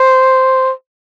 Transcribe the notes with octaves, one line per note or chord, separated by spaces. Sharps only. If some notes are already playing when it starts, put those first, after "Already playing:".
Already playing: C5